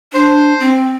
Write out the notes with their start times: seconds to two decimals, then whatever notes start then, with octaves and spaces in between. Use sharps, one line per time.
0.13 D4 C5
0.60 C4